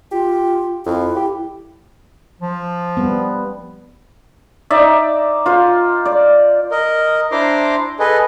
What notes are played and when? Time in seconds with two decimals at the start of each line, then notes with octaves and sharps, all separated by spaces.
0.12 F4 G4
0.86 F2 E4
1.17 G4
2.41 F3
2.97 G3 B3
4.70 D#4 D5 E5
5.46 F4 C5
6.05 D5
6.71 A#4 D#5
7.32 D4 E4 C5 A#5 C6 D6
7.99 G#4 A4 B4 D#5